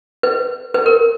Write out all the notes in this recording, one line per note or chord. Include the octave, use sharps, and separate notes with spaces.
B4
B4
A#4